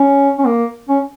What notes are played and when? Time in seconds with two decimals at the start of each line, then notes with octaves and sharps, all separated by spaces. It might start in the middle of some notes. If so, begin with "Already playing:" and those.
Already playing: C#4
0.38 C#4
0.47 A#3
0.89 C#4